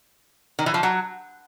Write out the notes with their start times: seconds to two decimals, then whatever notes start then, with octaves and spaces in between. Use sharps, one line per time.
0.59 D#3
0.66 E3
0.74 F3
0.83 F#3